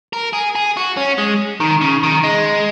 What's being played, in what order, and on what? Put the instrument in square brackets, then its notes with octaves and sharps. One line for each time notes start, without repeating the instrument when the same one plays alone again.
[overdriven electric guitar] A#4
G#4
G#4
F#4
C#4
G#3
D#3
C#3
D#3
G#3